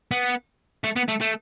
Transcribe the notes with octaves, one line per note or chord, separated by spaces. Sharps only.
B3
A3
B3
A3
A3